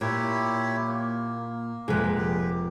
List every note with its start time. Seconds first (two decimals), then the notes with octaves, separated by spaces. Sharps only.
0.01 A#2 E4 G4 C#5
0.87 A#3
1.88 F1 A#2 G#3 B4 G5
2.18 G4